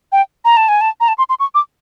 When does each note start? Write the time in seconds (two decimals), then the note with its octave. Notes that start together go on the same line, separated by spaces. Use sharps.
0.12 G5
0.45 A#5
0.57 A5
0.69 G#5
0.81 A5
1.00 A#5
1.08 A5
1.18 C6
1.29 C6
1.40 C#6
1.55 D6